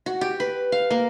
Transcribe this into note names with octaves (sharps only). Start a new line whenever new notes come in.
F#4
G4
B4
F5
A#3